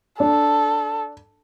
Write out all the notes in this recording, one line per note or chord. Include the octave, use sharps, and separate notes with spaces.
D4 A4